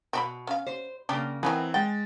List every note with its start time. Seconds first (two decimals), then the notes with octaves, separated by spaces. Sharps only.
0.13 B2 C4 E5 B5
0.47 C#4 F5
0.67 C5
1.09 C#3 A#3 D4 G4
1.43 D#3 E3 G3 B3 C4 G#5
1.74 G#3 G5 A6